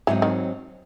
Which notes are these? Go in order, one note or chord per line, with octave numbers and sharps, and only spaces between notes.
G#2 E3 F#3 C4 D#4
D#3